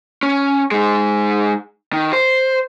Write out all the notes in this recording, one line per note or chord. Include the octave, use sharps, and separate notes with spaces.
C#4
G#3 D#4
D#3
C5